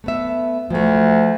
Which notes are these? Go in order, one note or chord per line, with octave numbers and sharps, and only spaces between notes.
A3 B3 E5
D2 F3 A3